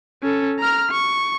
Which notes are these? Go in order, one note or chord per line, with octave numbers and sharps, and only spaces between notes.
C#4 A4
A#5 F6
C#6